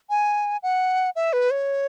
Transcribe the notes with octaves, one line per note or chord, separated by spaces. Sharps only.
G#5
F#5
E5
B4
C#5